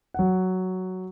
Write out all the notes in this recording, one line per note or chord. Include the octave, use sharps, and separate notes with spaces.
F#3 F#5